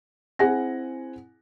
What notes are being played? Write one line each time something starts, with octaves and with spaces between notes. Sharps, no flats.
C4 E4 G#4 F#5 G#5 A#6